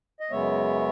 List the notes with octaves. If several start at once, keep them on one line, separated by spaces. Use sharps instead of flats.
D#5
F#2 C#3 G#3 B3 C#5 E5